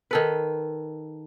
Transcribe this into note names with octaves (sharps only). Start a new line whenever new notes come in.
D#3 A4 B4